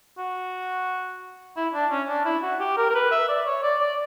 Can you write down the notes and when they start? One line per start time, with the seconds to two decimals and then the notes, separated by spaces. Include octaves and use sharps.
0.18 F#4
1.56 E4
1.74 D4
1.91 C#4
2.08 D4
2.25 E4
2.43 F#4
2.60 G4
2.77 A#4
2.89 A#4
2.95 B4
3.12 E5
3.29 D5
3.46 C#5
3.63 D5
3.80 D5